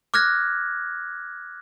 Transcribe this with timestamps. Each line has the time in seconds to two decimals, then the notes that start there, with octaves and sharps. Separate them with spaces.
0.14 D6 F6 F#6 G#6 A#6